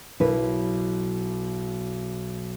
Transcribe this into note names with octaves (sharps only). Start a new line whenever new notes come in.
B1 E4 B4